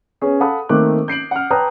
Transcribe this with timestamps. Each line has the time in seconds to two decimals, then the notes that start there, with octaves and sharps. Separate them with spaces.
0.21 B3 C#4 G#4
0.40 A4 F5 F#5 A5 B5 D#6
0.69 D#3 A3 A#3 C4 D6 F#6
1.08 G6 C7 D7 F#7
1.31 F#5 F6
1.50 B4 G5 A5 A#5 D#6 F#6